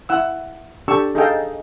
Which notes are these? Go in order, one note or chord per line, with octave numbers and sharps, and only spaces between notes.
E4 F#5 E6
D4 G4 A4 C#6 E6
D#4 G#4 A4 D#5 F5 G5